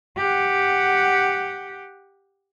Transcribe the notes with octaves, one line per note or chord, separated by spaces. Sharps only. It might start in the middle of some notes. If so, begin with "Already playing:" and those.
G4 F#5